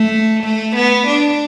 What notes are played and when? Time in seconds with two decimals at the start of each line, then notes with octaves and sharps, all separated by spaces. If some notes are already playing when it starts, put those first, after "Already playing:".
Already playing: A3
0.43 A3
0.76 B3
1.07 D4